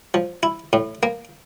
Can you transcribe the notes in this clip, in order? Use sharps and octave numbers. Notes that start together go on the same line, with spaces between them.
F3
E4
A2
A#3